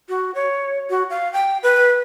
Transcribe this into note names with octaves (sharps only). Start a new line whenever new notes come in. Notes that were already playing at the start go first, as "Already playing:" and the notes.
F#4
C#5
F#4
F5
G5
B4